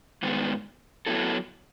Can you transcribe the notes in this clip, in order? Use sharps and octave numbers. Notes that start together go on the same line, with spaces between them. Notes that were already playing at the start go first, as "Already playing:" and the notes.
G#2 D#3 G#3 B3
F#3 B3 E4 A4